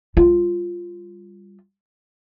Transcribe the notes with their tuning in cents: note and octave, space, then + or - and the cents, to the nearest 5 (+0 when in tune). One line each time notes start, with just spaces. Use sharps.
G3 +15 F4 +0